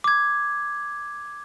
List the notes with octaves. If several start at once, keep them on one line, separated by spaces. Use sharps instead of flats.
D6 G#6